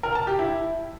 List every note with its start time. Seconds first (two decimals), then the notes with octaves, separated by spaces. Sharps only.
0.03 A#4
0.15 A5
0.27 G4
0.39 E4